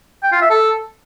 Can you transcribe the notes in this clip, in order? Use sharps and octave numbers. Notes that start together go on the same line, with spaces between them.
G5
F4
E5
A4